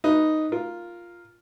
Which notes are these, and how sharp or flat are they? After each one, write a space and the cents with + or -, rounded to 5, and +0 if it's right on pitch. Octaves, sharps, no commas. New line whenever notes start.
D#4 +0 B4 -5
F4 +0 A#4 +0